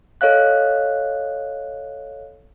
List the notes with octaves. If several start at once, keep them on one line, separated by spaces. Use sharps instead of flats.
A4 C#5 D#5 F5 F#6